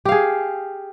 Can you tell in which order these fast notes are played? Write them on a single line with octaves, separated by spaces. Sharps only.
G4 F5 G#4